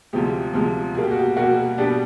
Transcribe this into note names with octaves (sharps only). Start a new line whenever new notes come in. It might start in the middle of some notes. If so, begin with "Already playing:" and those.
D2 C3 F3 G#3 G4
D2 C3 F3 G#3
B2 G3 A#3 G#4
G4
F#4
G4
B2 G3 A#3 F#4
B2 G3 B3 D4 G4